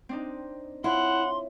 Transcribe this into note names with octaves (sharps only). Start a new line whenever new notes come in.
C4 D4 D#4
E4 F4 C#5 F#5 C6